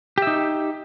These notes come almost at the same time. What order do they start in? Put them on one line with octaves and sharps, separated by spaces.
G4 E5 D#4